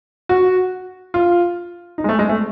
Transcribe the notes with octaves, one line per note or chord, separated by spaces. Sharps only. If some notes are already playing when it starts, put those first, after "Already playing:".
F#4
F4
D#4
G#3
A3
G#3
A3